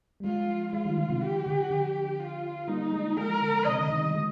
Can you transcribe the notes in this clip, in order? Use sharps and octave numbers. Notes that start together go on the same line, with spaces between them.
G3
F3 G#3 F4
F3 G#3 F4
D#3 G3
D3 F3
C3 D#3
D3 G4
D3 F3
D3
F4
G3 A#3 D#4
F3 G#3
F3 G#3 A#4
D3
C3 D#5
D3
C3 D#3
D#3 G3
F3 G#3